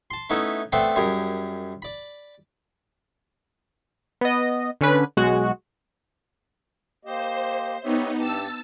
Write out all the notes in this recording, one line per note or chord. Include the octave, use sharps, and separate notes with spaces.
A5 C6
A3 B3 C#4 D#4 E4
A3 B3 C4 C5 D5 G5
F#2 G3 G#4 A#4
D5 B5
B3 D#5
D3 C#4 B4
B1 G#3 F#4
A#3 G4 C5 D#5
B3 D#4 G4 C#5 E5
G2 G4 A5 E6